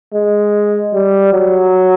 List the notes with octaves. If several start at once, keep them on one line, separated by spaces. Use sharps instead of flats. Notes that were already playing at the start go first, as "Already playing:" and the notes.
G#3
G3
F#3